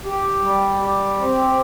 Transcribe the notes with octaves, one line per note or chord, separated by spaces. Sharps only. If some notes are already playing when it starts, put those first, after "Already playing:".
G4
G3
G4
C4